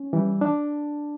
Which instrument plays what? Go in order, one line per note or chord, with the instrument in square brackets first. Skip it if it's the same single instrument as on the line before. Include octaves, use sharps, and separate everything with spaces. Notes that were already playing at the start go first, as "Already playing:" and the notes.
Already playing: [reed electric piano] C#4
E3 G3
D4